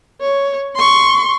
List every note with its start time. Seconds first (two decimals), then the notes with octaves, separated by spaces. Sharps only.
0.21 C#5
0.76 C6 C#6